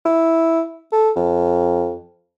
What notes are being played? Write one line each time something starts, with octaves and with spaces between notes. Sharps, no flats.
E4
A4
F2